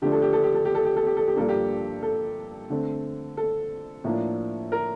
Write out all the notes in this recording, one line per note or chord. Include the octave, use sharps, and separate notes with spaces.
D3 F3 A3 D4 G4
A4
G4
A4
G4
A4
G4
A4
G4
A4
G4
A4
G4
G2 F3 A#3 D4 A4
G4
A4
D3 A3 C4
A4
A2 F3 A#3 D4
A#4